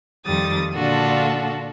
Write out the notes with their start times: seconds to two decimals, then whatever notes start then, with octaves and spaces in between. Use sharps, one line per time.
0.25 F2 D#3 G3 D#6 A6
0.74 A#2 D3 D4 F4 F#4 A4